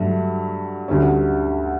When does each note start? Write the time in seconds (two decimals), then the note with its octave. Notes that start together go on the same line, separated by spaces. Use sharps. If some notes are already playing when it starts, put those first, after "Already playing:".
Already playing: G2 F#3 A3
0.88 D2 D3 G3 C#4